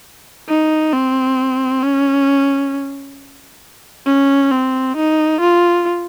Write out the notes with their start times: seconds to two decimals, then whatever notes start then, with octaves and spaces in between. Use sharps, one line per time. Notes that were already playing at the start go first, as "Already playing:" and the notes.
0.49 D#4
0.93 C4
1.83 C#4
4.06 C#4
4.51 C4
4.97 D#4
5.41 F4